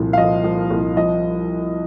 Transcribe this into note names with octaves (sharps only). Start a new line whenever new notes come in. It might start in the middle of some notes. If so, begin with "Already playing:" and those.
Already playing: C2 A#2 F3
F5
F3 D#5
F3
C2
F3 D#5